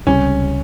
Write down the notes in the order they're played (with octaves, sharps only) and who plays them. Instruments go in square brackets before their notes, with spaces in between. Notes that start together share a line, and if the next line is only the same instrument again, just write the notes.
[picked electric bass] C#2 C3 G3 [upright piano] C#4